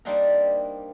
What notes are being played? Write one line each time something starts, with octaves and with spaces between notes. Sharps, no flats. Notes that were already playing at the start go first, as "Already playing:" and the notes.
G3 A#3 C4 D4 D#4 A#4